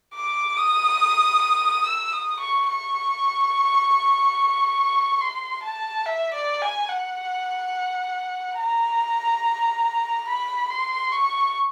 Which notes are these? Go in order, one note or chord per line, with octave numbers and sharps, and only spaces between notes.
D6
D#6
E6
D#6
C#6
C#6
C6
A5
E5
D5
G#5
F#5
A#5
B5
C6
C#6